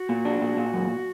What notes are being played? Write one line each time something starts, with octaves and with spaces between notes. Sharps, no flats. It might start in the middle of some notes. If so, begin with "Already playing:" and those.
Already playing: F#4
A#2
D4
A#2
A#2
F#2